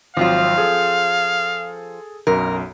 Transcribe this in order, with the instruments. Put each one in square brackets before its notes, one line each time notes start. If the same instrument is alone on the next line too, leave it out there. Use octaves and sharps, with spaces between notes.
[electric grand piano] G#1 F#3 [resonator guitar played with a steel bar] F3 C4 F4 [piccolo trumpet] F5
[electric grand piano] G#4 A4
[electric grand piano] B1 F#2 [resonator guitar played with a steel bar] A#4